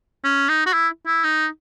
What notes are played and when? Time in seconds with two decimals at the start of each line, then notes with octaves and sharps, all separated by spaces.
0.24 C#4
0.49 D#4
0.66 F#4
0.73 E4
1.06 E4
1.24 D#4